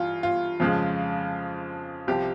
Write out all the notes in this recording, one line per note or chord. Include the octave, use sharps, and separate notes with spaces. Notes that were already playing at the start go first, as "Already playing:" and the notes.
Already playing: G2 E3 F4
F4
F2 C#3 F3 G#3
C2 C3 F3 G4